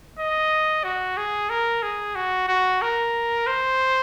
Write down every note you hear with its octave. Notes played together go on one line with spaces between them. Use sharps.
D#5
F#4
G#4
A#4
G#4
F#4
F#4
A#4
C5